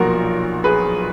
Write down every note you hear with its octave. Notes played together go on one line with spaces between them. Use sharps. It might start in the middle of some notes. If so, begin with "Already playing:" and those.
Already playing: B1 A#2 F3 F#4 A#4
G#4 B4